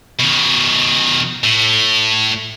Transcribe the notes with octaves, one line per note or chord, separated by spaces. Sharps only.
B2 D#3
A2